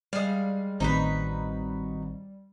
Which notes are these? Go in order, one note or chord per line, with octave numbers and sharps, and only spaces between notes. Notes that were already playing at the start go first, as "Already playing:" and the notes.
G3 G#3 F5
A1 D#3 C4 D#4 F#4 B4 C5